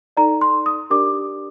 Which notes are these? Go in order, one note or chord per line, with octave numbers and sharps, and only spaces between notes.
D#4 A4 D5 A#5
C6
D#6
D4 G4 A#4 D5 D6